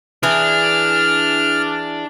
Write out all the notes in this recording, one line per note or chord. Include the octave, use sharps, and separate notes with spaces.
E3 D4 G#4 F6